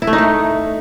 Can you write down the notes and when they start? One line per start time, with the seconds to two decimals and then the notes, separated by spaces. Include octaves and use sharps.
0.02 E4
0.07 A3
0.13 D#4
0.18 A3